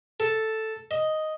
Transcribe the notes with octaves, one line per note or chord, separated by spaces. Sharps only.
A4
D#5